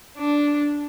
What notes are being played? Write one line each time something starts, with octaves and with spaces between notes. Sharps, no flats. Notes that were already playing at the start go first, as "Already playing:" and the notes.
D4